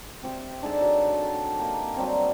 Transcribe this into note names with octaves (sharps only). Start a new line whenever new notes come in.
C4 G4 E5
D4 D#4 G#4 A4
F#3
A#3 G4
F#3 G3 C4